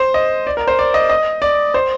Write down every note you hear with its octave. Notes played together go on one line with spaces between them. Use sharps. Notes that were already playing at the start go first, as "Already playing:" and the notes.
Already playing: C5
D#5
D5
A#4
C5
D5
D#5
D#5
D5
C5